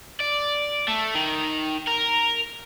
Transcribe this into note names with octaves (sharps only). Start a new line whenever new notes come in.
D5
A3
D#3
A#4